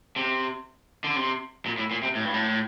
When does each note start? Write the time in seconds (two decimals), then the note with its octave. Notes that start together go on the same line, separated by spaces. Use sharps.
0.16 C3
1.04 D3
1.16 C3
1.66 A#2
1.78 A2
1.91 A#2
2.03 C3
2.15 A2
2.24 G2
2.34 A2